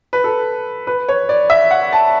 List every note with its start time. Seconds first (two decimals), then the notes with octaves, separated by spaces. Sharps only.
0.13 B4
0.24 A4
0.87 B4
1.09 C#5
1.29 D5
1.50 E5
1.71 F#5
1.92 A5